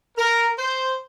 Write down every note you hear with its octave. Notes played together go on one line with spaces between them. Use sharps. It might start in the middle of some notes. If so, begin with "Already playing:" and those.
A#4
C5